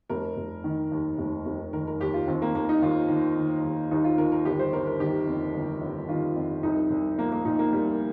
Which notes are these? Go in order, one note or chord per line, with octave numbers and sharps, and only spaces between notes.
F1 A#4
F1
D#3
D#2
F1
F1
D#3 A#4
A#4
D#2 G4
F4
D#3 C4
A#3
D#2 A#3
D#4
D#2 F4
D#3
D#3
D#2
D#2 D#4
F4
D#3 A#4
A#4
G1 G4
C5
G1 A#4
A#4
D#3 G4
F2
G1
G1
D#3 F4
F2
C2 D#4
C2
F3 A#3
A#3
A#2 D#4
A#3
C2 G3